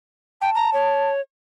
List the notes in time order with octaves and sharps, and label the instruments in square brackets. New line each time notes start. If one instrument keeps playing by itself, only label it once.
[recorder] G5 [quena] A5
[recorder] A#5
C#5